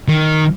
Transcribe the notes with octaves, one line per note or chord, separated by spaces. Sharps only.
D#3